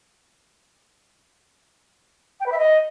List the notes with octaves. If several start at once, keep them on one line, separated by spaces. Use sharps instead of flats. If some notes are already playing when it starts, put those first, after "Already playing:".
G5
B4
E5
D#5